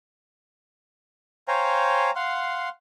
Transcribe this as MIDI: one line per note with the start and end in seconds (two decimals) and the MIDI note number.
1.48 2.10 72
1.48 2.10 73
1.48 2.10 77
1.48 2.10 79
1.48 2.10 80
1.48 2.10 82
2.15 2.69 77
2.15 2.69 78
2.15 2.69 84